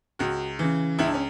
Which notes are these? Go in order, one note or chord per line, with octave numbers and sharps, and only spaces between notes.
C#2 F#4
C#3 E3
C#2 E4
D4
C#4